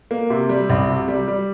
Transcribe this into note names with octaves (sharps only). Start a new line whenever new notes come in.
A#3
C3
G3
C2
C3
G3
G3